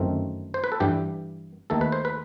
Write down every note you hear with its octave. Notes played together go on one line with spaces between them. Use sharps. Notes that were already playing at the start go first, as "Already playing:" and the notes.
Already playing: G1 F#2 D#3 A3 C4
C5
B4
A4
G2 E3 G3 G4
D#2 D#3 A3 A4
B4
C5
B4